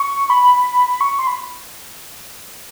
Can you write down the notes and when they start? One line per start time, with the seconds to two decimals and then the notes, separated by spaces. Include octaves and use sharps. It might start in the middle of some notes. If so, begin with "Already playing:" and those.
Already playing: C#6
0.30 B5
1.01 C#6
1.19 C6
1.27 B5